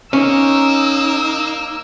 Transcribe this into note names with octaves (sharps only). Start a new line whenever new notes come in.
A#3 C#4 D#4 E6